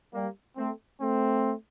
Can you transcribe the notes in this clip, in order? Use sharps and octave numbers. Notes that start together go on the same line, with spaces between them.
G3 A#3
A3 C4
A3 C4